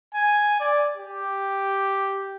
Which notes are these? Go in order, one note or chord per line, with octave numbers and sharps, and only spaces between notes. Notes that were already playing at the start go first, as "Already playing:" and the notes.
G#5
D5
G4